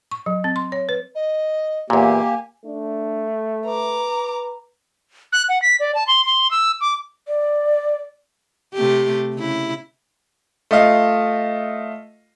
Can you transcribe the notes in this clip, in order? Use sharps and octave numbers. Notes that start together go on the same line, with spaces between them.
C#6
F#3
C4
C6
C#5
B4
D#5
E2 A#2 A#3 G4 G#5
A3 D4
B4 A#5 D6
F#6
F#5
B6
D5
A5
C6
C6
E6
D6
D5
C3 A3 G4
C#3 E4
A3 F4 D#5 F5